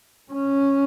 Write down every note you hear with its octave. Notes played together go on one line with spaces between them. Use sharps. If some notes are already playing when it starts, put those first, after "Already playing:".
C#4